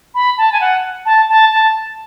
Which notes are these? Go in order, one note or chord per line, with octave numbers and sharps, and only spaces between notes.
B5
A5
G#5
F#5
A5
A5
A5